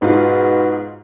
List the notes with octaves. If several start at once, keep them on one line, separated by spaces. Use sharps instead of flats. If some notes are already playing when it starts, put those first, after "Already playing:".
G#2 B2 F4